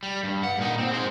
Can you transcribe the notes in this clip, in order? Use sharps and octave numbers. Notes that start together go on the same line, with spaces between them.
G3
G2
F#5
A#2 D#4
C4
G#3 C5